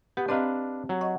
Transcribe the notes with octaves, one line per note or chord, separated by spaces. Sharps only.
B3 G4
C4 D4 B4 D#5 F5 A#5
F#3
D#5 F#5 C#6